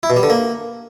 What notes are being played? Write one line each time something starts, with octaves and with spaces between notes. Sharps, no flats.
E4
B2
G3
D3
A#3